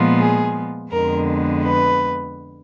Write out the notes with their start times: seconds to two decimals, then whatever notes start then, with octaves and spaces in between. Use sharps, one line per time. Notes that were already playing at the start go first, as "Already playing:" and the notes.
Already playing: A#2 F3 G#3 B3
0.19 G#4
0.91 F2 D3 G#3 B3 A#4
1.63 B4